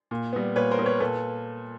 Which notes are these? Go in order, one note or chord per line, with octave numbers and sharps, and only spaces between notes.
A#2
G3 B3
A#2 B4 C#5
A#4 C5
G3 B3
B4 C#5
A#2 A4 B4